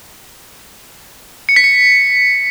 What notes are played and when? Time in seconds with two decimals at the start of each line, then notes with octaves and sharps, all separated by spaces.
1.49 C#7
1.56 B6
1.64 C#7